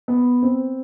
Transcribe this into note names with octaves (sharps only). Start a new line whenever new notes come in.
B3
C4